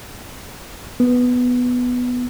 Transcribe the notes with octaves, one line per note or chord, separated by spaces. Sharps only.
B3